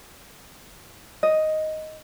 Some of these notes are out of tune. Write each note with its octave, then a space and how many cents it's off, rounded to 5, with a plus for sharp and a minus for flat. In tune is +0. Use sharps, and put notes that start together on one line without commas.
D#5 +5